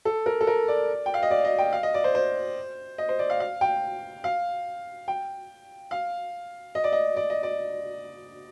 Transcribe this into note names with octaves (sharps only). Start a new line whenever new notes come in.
A4
A#4
A4
A#4
D5
G5
F5
D#5
D5
D#5
G5
F5
D#5
D5
C5
C5
D#5
C5
D5
F5
F5
G5
F5
G5
F5
D#5
D5
D#5
D5
D#5
D5